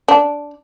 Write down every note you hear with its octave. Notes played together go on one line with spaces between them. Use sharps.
D4